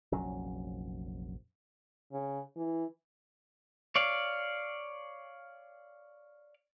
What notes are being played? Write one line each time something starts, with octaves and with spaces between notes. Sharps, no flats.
F1 A#1 F#3 C#4
C#3
E3
C#5 D5 F5